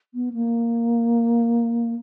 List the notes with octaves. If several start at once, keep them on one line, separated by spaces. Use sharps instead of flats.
B3
A#3